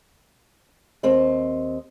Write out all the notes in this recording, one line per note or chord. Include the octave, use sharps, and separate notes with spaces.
D#2 C4 D#5